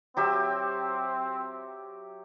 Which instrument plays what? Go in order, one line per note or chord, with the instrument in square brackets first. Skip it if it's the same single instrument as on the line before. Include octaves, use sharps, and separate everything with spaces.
[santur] F#3 G4 E5 [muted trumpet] C4